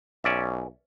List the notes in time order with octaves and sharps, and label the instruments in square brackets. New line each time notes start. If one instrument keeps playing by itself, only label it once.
[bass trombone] B1 [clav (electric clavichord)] C#4 D5 E5